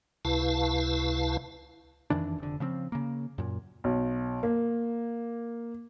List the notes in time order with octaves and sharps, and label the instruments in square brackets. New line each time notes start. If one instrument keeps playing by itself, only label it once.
[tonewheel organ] C#2 C3 E4 B4 F5 A5
[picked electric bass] F2 D#3 E3 D4
F1 D3
C#3 F3 B3 C4
C#3 A#3
F#2 A#2
[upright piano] B1
A#3